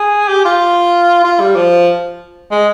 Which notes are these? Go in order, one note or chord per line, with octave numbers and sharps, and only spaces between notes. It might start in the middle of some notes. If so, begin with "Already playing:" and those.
Already playing: G#4
G4
F4
F4
G3
F3
G#3